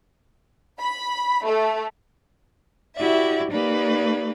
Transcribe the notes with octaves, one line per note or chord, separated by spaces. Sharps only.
B5
A3
E4 F#4 G4 D5 E5
A#3 D#4 G4 B4 D5